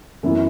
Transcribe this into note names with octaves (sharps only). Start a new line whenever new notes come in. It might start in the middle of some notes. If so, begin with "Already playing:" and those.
F#2 E3 B3 E4